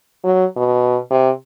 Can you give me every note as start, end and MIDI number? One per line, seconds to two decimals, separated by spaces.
0.24 0.45 54
0.56 0.98 47
1.11 1.30 48